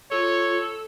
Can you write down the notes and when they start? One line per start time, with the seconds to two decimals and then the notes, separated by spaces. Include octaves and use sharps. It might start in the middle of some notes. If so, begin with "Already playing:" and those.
0.12 F4 A4 C#5